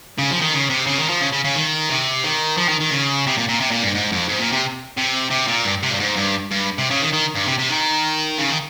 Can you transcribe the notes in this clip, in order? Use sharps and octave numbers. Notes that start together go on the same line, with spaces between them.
C#3
F3
D#3
C#3
C3
C#3
D#3
F3
C#3
C#3
C#3
D#3
C3
D#3
F3
D#3
D#3
C#3
C3
A#2
A#2
C3
A#2
G2
G#2
F2
G#2
A#2
C3
C3
C3
A#2
G2
C3
G2
G#2
G2
G2
C3
C#3
D#3
D#3
G2
C3
C3
D#3
C#3
D#3